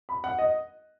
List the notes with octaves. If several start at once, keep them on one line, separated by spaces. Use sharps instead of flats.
B5
F#5
D#5